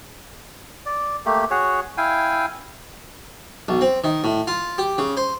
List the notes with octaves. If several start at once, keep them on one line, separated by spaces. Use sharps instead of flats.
D5
A3 A#3 G4
F#4 G#4 C#5
E4 F5 G5 G#5
B1
C4
D#3
A2
F4
G4
C#3
C5